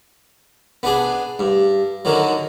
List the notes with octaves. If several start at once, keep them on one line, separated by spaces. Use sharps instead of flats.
B3 D4 G#4
G2
D3 D#3 F#3